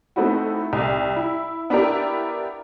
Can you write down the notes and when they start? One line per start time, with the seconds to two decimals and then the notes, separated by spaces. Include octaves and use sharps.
0.16 A3 B3 C4 D#4 E4 F#4
0.73 C2
1.16 E4
1.70 B3 D4 E4 G4 A#4